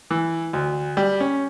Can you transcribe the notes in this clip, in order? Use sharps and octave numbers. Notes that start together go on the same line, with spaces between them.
E3
D2
G3
C#4